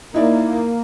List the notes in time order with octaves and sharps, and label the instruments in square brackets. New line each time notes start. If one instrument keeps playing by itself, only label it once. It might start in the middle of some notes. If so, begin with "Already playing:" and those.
[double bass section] A#3 [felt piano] D#4 E4 D5